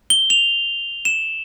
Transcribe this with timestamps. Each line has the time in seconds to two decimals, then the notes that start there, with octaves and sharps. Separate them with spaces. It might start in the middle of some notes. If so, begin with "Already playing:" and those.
0.10 G7
0.30 F7
1.05 E7